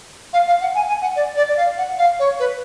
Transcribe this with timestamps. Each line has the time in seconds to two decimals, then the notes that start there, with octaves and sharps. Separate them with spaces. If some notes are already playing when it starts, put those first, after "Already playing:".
0.33 F5
0.47 F5
0.61 F#5
0.74 G#5
0.88 G#5
1.01 F#5
1.15 D5
1.36 D5
1.48 D5
1.56 F5
1.78 F#5
1.98 F5
2.19 C#5
2.39 B4